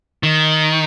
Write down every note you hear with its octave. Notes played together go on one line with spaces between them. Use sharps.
D#3